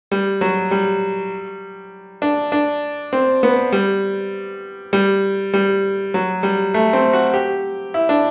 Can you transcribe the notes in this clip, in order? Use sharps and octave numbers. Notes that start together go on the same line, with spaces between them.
G3
F#3
G3
D4
D4
C4
B3
G3
G3
G3
F#3
G3
A3
C4
F#4
G4
E4
D4